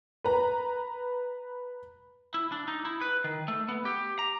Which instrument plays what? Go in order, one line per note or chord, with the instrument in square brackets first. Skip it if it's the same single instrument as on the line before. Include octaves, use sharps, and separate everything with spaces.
[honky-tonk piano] B4 A#5
[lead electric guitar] E4
D4
D#4
E4
B4
D#3
A3
B3
G4
A#5